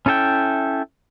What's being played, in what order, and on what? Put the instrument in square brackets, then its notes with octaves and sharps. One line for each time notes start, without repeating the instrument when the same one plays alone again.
[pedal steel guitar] C#4 E4 A4 E5 G5